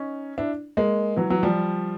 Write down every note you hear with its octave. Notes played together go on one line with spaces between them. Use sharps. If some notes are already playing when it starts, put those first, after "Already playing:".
Already playing: C#4 D#4
D4 E4
G#3 A#3
E3 F#3
E3 F#3
F3 G3